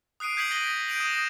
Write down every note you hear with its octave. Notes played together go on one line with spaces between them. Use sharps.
D#6 F#6 C7 D7 D#7
G6 G#6 B6 D7 D#7 F#7
D#6 A#6 G7
G6 D7 D#7 F7 F#7
D#6 A#6 E7